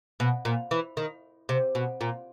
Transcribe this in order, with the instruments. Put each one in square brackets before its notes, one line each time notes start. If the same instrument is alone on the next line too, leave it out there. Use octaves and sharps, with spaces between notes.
[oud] B2
A#2
E3
D#3
C3
B2
A#2